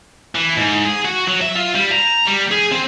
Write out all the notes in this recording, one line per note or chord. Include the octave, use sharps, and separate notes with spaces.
E3
G#2
G#4
F#4
F#3
E5
F4
G3
A#5
G3
G#4
C4